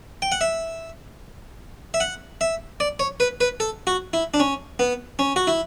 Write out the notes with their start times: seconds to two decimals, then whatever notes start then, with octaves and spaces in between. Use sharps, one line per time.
0.22 G5
0.32 F#5
0.41 E5
1.94 E5
2.00 F#5
2.41 E5
2.80 D5
3.00 C#5
3.20 B4
3.41 B4
3.60 A4
3.87 F#4
4.13 E4
4.34 D4
4.40 C#4
4.79 B3
5.19 C#4
5.36 F#4
5.47 E4